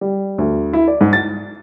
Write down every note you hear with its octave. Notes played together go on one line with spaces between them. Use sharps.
G3
D2
E4
D5
G#2
A6